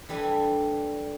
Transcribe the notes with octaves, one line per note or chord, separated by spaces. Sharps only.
E3 G3 A3 D4 G#5